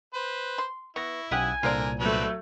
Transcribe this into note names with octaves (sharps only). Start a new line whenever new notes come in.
B4 C5
C6
B3 E4 C#6 A#6
B1 C#4 G4 F#5 G#5 D#6 F#6
C2 A#2 D3 F4 A#4 C5 D5
F#3 A3 C4 D4 B4